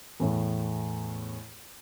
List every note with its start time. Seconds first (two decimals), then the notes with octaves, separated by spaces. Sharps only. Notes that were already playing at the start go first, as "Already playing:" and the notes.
0.20 E2 A2